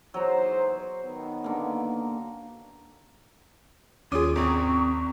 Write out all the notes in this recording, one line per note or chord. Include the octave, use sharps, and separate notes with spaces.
E2 G#2 F#3 C5 A#5
D#3 B3
D3 A#3
D#2 C#4 F4 G#4 D6 D#6
G#1 C4 C#6